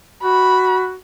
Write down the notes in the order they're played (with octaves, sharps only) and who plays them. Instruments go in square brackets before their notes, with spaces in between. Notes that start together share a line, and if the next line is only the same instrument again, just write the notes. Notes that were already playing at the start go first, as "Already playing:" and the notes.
[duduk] F#4 [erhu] B5